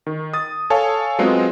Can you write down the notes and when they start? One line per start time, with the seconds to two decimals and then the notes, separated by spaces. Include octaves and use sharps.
0.07 D#3
0.33 D#6 A6
0.70 A4 C#5 F5 G#5 A5
1.19 F#3 G#3 B3 C4 F4